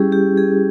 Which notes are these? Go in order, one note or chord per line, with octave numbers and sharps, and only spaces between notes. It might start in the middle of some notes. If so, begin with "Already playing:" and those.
Already playing: G3 C#4 E4 G4 G#4
G4
G#4